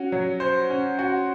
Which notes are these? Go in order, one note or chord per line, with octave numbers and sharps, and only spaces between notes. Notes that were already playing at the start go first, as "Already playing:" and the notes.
Already playing: C#4 F#4
F#3
C5
C#4
F#4